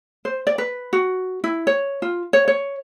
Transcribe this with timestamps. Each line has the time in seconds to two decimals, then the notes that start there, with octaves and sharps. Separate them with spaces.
0.25 C5
0.47 D5
0.58 B4
0.93 F#4
1.44 E4
1.67 C#5
2.02 F4
2.33 C#5
2.48 C#5